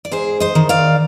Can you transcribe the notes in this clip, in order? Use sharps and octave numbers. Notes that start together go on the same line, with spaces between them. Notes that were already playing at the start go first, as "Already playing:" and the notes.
D5
G#2 G#4 C5
C5 D#5
D#3
D5 F5